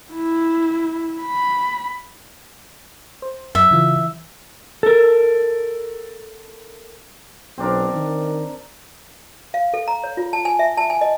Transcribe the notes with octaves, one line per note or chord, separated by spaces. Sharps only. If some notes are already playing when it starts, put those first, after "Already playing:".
E4
B5
C5
F#2 E5
C#3 E3 F4
E3
A4 A#4
B1 C4 D4 A#4
D#3
F5
A4
A#5
C#5
F4
A5
G#5
E5
A5
G#5
D#5